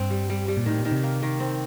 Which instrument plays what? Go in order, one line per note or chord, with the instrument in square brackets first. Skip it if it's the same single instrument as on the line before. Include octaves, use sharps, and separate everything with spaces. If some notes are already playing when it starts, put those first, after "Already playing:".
Already playing: [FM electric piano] G2 [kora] C4
[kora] G3
G3
G3
[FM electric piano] A#2
[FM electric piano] A2 [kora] D#3
[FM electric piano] A#2
[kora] D#3
[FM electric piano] C3
[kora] A#3
D#3
C4